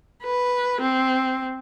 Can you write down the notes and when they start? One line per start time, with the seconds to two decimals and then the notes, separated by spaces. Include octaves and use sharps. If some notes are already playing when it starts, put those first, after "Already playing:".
0.23 B4
0.81 C4